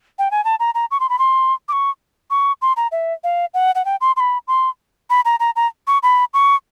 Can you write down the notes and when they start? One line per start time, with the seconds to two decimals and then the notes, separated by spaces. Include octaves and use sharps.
0.19 G5
0.31 G#5
0.45 A5
0.60 A#5
0.75 A#5
0.91 C#6
1.00 C6
1.09 B5
1.19 C6
1.68 D6
1.72 C#6
2.30 C#6
2.62 C6
2.77 A#5
2.92 E5
3.24 F5
3.54 F#5
3.75 F#5
3.85 G5
4.01 C6
4.16 C6
4.20 B5
4.48 C6
5.10 B5
5.25 A#5
5.40 A#5
5.56 A#5
5.87 C#6
6.03 B5
6.34 C#6